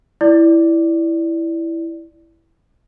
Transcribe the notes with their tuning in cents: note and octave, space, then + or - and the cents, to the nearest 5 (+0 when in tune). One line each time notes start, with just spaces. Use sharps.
E4 +0 D5 +0